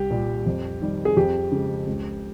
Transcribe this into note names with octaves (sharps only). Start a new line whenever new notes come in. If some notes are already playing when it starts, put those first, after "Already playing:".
Already playing: C2 G4
A#2 G3
F2
D#3 G3
G#4
F2 G4
C#3 G#3
C#2